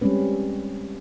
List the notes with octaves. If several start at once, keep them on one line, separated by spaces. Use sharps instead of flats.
G3 G#3 C4 C#4 B4